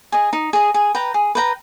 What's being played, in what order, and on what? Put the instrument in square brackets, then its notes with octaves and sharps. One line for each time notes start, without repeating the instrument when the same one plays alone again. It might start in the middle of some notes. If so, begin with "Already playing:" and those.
[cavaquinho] G#4 D#5
D#4
G#4 D#5
G#4
B4 G5 A#5
G#4
B4 G5 A#5